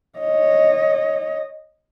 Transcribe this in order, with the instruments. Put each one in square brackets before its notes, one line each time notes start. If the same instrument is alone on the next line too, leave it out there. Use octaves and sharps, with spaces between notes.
[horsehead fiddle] C#5 D#5